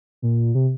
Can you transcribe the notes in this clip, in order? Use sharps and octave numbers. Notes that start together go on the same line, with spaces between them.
A#2
C3